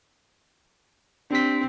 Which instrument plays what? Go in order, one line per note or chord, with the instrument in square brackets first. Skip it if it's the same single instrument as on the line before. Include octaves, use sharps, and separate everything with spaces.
[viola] C4 [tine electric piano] D4 G4 B6